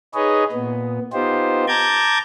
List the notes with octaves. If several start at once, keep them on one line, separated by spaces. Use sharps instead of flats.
D#4 G#4 B4 C#5 D#5
A#2 B3
B3 D#4 F4 G4 C5
A5 A#5 D6 G6 G#6